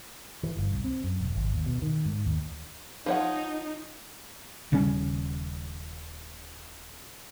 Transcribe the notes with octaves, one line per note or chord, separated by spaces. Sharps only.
E3
G1
C2
C4
F#2
E1
G#1
D#2
B2
D#3
G#2
D#2
F3 D#4 C#5 F#5
D#1 C#3 G3 C#4